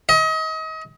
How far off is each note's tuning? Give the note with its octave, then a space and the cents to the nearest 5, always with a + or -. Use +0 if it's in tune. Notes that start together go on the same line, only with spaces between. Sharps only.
D#5 +35